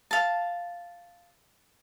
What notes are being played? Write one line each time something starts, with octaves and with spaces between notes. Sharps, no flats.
F5 A5